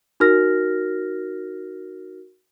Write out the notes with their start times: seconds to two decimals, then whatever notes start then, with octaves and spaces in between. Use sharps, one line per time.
0.20 D#4 F#4 A#4 F6 A#6